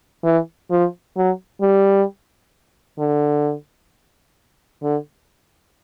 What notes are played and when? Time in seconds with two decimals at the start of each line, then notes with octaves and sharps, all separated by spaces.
0.24 E3
0.70 F3
1.16 F#3
1.61 G3
2.98 D3
4.82 D3